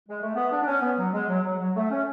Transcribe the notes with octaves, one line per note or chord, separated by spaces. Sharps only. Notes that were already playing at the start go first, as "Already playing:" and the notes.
G#3
A3
B3
D4
D4
C#4
B3
F#3
G#3
F#3
F#3
F#3
A3
C#4